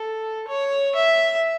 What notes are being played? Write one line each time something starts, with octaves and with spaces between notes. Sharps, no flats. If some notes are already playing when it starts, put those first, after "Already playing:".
Already playing: A4
C#5
E5